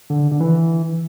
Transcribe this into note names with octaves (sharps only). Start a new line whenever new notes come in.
D3
D3
E3